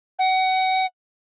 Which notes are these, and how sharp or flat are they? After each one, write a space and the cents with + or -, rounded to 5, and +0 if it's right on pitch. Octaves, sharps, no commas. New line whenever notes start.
F#5 +25